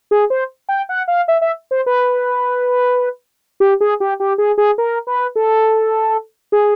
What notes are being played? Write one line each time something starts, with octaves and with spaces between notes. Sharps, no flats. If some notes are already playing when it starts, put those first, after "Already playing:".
G#4
C5
G5
F#5
F5
E5
E5
C5
B4
G4
G#4
G4
G4
G#4
G#4
A#4
B4
A4
G#4